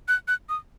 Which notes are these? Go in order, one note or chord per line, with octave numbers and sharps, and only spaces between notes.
F#6
F#6
D#6